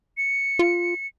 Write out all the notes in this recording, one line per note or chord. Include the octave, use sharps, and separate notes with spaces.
C#7
F4